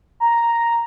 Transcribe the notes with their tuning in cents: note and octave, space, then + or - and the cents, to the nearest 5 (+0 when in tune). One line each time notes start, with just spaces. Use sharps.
A#5 +0